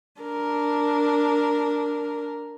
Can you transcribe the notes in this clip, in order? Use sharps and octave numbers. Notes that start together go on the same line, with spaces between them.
D4 A#4